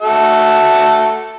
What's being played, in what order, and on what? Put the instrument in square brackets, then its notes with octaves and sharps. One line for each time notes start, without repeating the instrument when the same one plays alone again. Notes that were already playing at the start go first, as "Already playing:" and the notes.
[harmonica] F#4 A4 E5